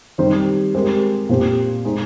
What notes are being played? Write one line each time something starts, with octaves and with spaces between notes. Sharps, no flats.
D#3 G3 C4 G4 C5
G#3 C4 G4 A#4
A#2 F3 C4 G4
G#3 D#4 G#4 C5